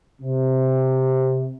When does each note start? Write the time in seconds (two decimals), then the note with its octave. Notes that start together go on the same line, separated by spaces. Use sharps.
0.21 C3